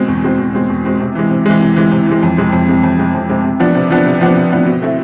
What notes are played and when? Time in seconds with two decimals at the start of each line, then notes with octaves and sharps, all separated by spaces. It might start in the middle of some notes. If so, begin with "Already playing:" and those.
Already playing: B2 G#3 C4
0.08 E2
0.24 B2 G#3 C4
0.39 E2
0.54 B2 G#3 C4
0.70 E2
0.85 B2 G#3 C4
1.00 C3
1.15 E3 G#3
1.30 C3
1.46 E3 G#3
1.61 C3
1.76 E3 G#3
1.92 C3
2.07 E3 G#3
2.23 F2
2.37 C3 G#3 C4
2.53 F2
2.68 C3 G#3 C4
2.83 F2
2.99 C3 G#3 C4
3.14 F2
3.29 C3 G#3 C4
3.44 C3
3.60 F3 B3 D4
3.75 C3
3.90 F3 B3 D4
4.06 C3
4.21 F3 B3 D4
4.36 C3
4.52 F3 B3 D4
4.67 B2
4.82 A3 C4 E4